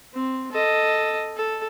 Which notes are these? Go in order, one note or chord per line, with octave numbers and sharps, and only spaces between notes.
C4
A4 D#5
A4